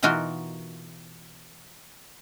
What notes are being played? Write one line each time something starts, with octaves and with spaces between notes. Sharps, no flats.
B2 E3 D#4 F4 F#4 A#4